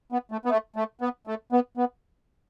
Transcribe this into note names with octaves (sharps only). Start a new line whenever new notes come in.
B3
A3
B3
A3
A3
B3
A3
B3
B3